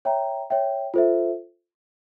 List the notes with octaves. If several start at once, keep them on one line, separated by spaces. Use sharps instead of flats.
C#5 E5 G5 A#5
C#5 E5 G5
F4 A4 C5 E5